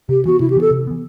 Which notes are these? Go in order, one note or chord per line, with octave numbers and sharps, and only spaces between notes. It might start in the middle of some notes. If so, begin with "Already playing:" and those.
C3 G4
E3 B3 F#4
C3 E4
G4
E3 B3 A4
C3
E3 B3